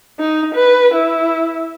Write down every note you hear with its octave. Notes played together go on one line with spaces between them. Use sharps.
D#4
B4
E4